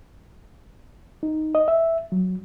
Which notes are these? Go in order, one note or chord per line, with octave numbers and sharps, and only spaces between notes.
D#4
D#5
E5
F#3